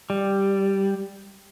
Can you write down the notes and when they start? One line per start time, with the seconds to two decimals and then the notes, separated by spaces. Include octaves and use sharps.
0.10 G3